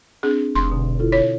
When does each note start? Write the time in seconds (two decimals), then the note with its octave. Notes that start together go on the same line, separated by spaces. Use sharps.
0.23 C4 D4 G#4
0.55 F1 C6
0.71 B2 D3
0.99 E4 F4 A4
1.12 C#5